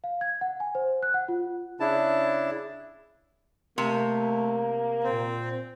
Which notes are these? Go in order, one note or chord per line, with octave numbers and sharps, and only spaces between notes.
F5
G#6
F#5
G#5
C5
F#6
F#5
F4
C#3 D4 E4 A5
C3 A3 A#3
A#2 C4